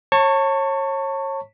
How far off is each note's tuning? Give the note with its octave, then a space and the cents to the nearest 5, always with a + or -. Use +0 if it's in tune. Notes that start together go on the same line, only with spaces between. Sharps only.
C#5 -30 A5 +30 C#6 +0